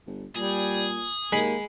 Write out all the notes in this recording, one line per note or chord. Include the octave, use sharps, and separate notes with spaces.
G1
A#2 G3 G#4
D#2 G#3 A#3 B5